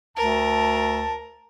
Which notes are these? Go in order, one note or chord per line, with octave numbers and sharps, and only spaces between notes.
D2 A#4 A5